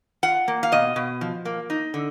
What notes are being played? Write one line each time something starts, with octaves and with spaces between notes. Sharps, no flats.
F4 F#5
A#3
F5
B2 D#5
B2
F3
A#3
D#4
D3